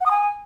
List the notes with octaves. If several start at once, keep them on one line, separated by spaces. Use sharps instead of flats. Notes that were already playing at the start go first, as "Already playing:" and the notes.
F#5
D#6
G#5